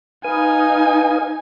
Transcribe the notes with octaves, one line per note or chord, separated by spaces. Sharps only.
D#4 B4 F5 G#5 D#6